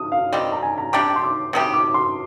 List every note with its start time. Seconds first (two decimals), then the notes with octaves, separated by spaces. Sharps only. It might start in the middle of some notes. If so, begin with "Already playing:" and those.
Already playing: D#6
0.12 F5
0.32 D#3 G3 C4 G4 D5
0.52 A#5
0.62 G#5
0.78 A#5
0.93 C3 G3 D4 G4 D6
1.16 C6
1.24 D6
1.53 C3 G3 D4 G4 D#6
1.73 D6
1.94 C6